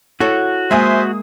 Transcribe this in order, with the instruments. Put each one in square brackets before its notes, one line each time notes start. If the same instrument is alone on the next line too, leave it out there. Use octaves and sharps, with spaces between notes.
[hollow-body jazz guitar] E4 A4 C#5 [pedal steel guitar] F#4
[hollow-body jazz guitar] G#3 A#3 D#5 [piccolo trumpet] C5 [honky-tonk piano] E5 G#5 D#6